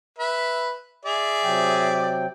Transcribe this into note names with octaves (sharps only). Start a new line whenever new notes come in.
B4 E5
G#4 D5 E5
C3 F#3 G5